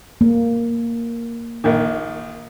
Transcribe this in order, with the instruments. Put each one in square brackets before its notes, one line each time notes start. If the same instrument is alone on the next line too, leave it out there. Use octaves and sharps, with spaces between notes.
[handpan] A#3
[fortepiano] A#1 D#3